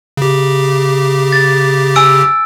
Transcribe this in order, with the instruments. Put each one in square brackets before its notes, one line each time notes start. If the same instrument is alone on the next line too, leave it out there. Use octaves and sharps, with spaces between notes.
[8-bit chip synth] C#3 G4
[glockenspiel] A6
G#5 E6 D7